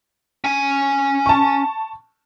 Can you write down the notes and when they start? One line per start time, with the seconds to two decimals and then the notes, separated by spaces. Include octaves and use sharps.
0.44 C#4 G#5
1.26 A5 C#6